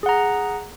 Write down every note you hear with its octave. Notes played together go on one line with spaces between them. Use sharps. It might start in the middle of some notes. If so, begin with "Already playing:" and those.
G#4 F#5 A#5